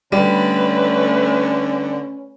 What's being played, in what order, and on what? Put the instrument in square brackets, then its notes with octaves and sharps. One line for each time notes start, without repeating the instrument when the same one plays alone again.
[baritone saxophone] D3 [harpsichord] G3 [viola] A3 B4 [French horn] C#4